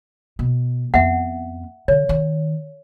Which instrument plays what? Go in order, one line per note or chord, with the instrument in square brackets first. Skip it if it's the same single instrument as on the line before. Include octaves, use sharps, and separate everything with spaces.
[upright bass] B2
[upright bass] F2 B3 [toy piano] E5 F#5
[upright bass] D3 [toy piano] C#5
[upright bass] D#3